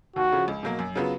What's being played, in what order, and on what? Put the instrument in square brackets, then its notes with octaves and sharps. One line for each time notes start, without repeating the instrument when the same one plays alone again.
[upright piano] D#2 [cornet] F#4
[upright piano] C#3 F3
C#2
B2 F#3 A#3
F#2
C#3 F#3 B3 F4